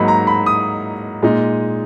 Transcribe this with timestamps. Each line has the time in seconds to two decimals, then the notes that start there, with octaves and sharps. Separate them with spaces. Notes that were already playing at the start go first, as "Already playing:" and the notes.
Already playing: G#2 F#3 A#3 D#4 B5
0.08 A#5
0.27 B5
0.46 D#6
1.23 A#2 G#3 D#4